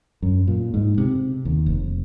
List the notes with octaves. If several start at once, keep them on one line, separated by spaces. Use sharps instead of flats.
F#2
A#2
G#2
C3
D#2
F1